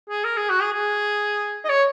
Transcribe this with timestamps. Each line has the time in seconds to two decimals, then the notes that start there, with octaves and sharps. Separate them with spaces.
0.10 G#4
0.25 A#4
0.37 G#4
0.50 F#4
0.61 G#4
0.73 G#4
1.65 D#5
1.69 C#5